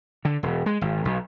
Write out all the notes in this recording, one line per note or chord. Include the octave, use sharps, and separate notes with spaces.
D3
E1
G#3
G#1
B1